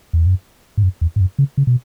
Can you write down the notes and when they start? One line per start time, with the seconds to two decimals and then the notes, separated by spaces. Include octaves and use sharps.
0.13 E2
0.26 F#2
0.77 G#2
0.83 F#2
1.01 E2
1.16 G#2
1.20 F#2
1.39 C#3
1.57 C#3
1.67 B2